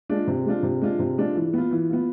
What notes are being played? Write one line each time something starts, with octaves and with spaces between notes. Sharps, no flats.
G#3 D4 F4
C3
G#3 D4 F4
C3
G#3 D4 F4
C3
G#3 D4 F4
E3
B3 F4
E3
B3 F4